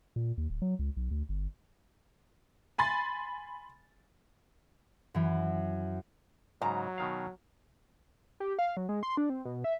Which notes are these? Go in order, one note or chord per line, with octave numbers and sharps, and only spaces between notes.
A#2
D#2
D1
F#3
C#2
B1
D2
G1
G#5 B5 C6 A6
F#2 E3
G#2 C#3 F#3 A#5
B2 D#3 F5
G4
F5
F#3
G#3
C6
D4
C4
B2
E5